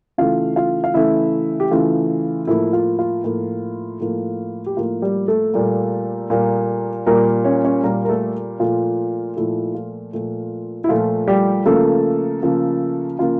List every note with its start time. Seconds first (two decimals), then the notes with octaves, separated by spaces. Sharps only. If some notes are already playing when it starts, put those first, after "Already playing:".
0.18 C#3 E3 A3 F4 F5
0.56 F4 F5
0.84 F5
0.94 C#3 E3 A3 E4 E5
1.60 G4
1.71 C#3 E3 A3 F4
2.47 A2 F3 A#3 E4
2.73 F4
2.99 F4
3.24 A2 F3 A#3
4.00 A2 F3 A#3
4.66 G4
4.77 A2 F3 A#3 F4
5.02 G3 G4
5.28 A3 A4
5.54 A#2 G3 A#3
6.30 A#2 G3 A#3
7.06 A#2 G3 A#3 A#4
7.44 C#4 C#5
7.65 C#4 C#5
7.84 A#2 G3 A#3 A#4
8.05 A#4
8.09 A3 A4
8.60 A#2 F3 A3 F4
9.36 A#2 F3 A3 E4
9.75 F4
10.13 A#2 F3 A3
10.84 E4
10.89 A#2 F3 A3 F4
11.28 G3 G4
11.66 C#3 F3 A3 A#3 A4
12.42 C#3 F3 A#3
13.19 C#3 F3 A#3 F4